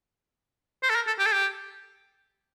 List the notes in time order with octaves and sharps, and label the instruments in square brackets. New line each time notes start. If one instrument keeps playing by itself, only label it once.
[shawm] C5
A4
A#4
A4
G4
A4
G4